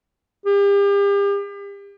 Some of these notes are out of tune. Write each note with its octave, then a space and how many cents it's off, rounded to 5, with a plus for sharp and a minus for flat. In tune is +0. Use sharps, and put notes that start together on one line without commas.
G4 +40